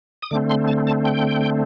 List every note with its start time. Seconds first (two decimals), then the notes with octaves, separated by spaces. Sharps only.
0.22 D#6
0.31 D3 A3 C4 D6
0.50 C6
0.68 A5
0.87 A5
1.05 G5